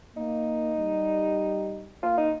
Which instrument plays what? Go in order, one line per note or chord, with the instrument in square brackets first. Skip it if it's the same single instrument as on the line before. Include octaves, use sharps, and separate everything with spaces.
[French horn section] A#3 [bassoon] D#4
[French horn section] G3
[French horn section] A#3 [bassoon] F4
[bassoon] D#4